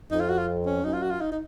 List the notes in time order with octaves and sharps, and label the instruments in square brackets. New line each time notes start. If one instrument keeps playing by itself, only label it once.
[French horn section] F2 [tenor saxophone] D#4
[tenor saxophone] F4
F#4
F4
C#4
[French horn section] F#2 [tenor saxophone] D#4
[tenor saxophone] F4
F#4
F4
D#4
D#4